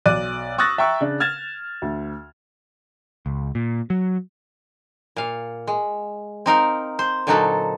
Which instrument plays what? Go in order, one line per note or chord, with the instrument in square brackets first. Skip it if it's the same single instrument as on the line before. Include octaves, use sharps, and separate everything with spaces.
[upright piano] B1 D5 F#6 D#7
C#6 D#6 E6 F#6 A6 A#6
E5 G5 A#5 C#6 E6
C#3 D4
F6 G#6 A6 E7
D2
[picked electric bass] C#2
A#2
F#3
[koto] A#2 F5
G#3
C4 D#4 A#4 F5
C5
A#2 D3 F#3 D#4 F#4 A4